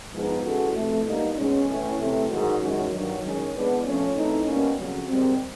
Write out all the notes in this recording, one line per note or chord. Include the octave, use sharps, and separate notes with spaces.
G#2 F3 G#3 B3 D#4
E3 G#3 C#4 F#4 A4
F2 C3 E3 A3
B2 G3 A#3 D#4
B2 G#3 C#4
A2 E3 A3 C#4
C3 E3 A3
G#2 D#3 F#3
F#2 D#3 G#3 C#4 F#4
G2 D#3 F#3
D#3 G#3 C#4
E3 G#3 B3 D4
F3 A3 C#4
E3 A3 C4 D#4
B2 G3 A#3 C#4
F2 C#3 F#3
G#2 D#3 G3 C4